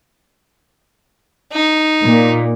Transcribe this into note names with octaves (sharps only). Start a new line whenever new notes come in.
D#4
A#2 A#3